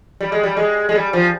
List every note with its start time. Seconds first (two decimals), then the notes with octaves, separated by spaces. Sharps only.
0.20 G3
0.32 G#3
0.44 G3
0.57 G#3
0.89 G#3
0.95 G3
1.13 F3